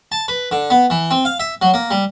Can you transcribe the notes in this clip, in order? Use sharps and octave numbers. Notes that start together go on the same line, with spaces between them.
A5
B4
D3
B3
E3
C4
F5
E5
F#3
A#3
G3